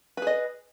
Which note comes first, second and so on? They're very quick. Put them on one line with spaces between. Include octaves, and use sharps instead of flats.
B4 G#4 D#5